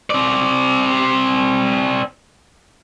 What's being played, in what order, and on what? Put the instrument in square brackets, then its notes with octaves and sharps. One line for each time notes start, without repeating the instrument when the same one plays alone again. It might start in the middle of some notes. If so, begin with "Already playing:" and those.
[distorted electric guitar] C4 D5